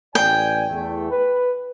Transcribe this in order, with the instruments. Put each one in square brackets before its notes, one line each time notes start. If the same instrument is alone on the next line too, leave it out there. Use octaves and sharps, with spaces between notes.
[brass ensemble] A1 D5 G#5 [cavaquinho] G5
[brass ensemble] E2 A3
B4